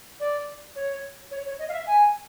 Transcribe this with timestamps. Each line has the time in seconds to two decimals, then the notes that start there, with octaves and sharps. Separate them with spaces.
0.19 D5
0.75 C#5
1.31 C#5
1.45 C#5
1.59 D#5
1.68 F5
1.73 E5
1.87 G#5